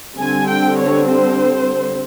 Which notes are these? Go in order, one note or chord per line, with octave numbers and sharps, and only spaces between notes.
D3 G3 C4 G#5
G5
C#5
C5